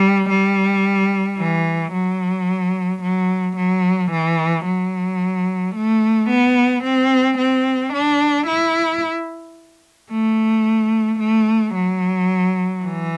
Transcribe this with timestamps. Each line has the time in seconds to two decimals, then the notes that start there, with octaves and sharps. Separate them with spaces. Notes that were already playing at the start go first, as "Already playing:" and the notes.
Already playing: G3
0.29 G3
1.38 E3
1.93 F#3
3.02 F#3
3.56 F#3
4.11 E3
4.65 F#3
5.75 A3
6.30 B3
6.84 C4
7.38 C4
7.93 D4
8.47 E4
10.11 A3
11.20 A3
11.75 F#3
12.84 E3